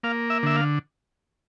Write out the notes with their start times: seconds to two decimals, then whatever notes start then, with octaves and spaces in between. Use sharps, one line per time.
0.03 A#3 F5
0.30 E5
0.43 D3 E5
0.56 F5